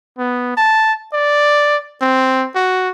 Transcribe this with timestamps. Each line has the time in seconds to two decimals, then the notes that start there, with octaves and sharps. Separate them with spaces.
0.18 B3
0.57 A5
1.14 D5
2.02 C4
2.55 F#4